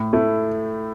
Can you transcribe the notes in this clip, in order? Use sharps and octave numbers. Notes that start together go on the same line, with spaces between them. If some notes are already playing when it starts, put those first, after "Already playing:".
Already playing: A2
A3 E4